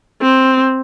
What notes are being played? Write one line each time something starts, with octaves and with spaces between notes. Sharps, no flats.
C4